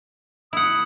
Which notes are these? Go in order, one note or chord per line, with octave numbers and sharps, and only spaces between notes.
E4 F#5 D#6